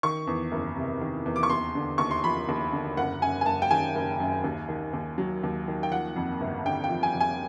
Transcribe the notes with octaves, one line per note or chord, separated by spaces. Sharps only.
D#3 C#6
E2
F#1
C3
D#3
E2
D6
C#6
D#2 C6
D3
D#2 C#6
C6
F3 B5
D#2
D3
F#1 F#5
F#2 G#5
G#5
F#1 A5
G5
D#3 G#5
F#1
F#2
D#2
D#3
D#2
F#3
D#2
D#3
G5
F3 F#5
F2
G1
D3 G5
G5
F3
G#5
F2
G#5